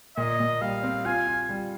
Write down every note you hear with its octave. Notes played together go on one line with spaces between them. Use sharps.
A#2 D#5
A#2
G3 F5
C4
F4 G#5
F4
G3